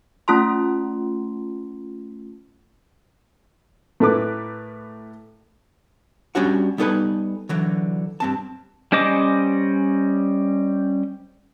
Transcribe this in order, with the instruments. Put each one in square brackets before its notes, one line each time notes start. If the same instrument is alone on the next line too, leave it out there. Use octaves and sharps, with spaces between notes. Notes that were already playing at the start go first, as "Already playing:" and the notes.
[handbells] A3 C#4 F4 A5 C6
[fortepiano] A2 A3 A#4 B4 D6
[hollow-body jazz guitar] G3 C#4 D4 F#4 F#5
G3 B3 D#4 A4 B4 G#5
D3 E3 F#3
G2 C4 A5
[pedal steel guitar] G3 C#4 C5 D#5 D6